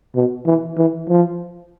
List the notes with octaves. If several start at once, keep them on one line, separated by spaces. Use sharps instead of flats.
B2
E3
E3
F3